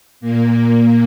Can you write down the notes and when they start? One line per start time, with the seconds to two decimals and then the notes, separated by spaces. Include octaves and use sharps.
0.21 A#2 A#3